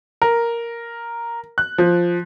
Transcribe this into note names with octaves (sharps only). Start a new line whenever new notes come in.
A#4
F#6
F3